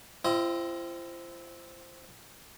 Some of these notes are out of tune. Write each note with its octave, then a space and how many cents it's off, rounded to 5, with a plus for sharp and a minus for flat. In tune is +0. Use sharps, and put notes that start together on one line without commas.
C4 +0 F4 -45 D#5 +15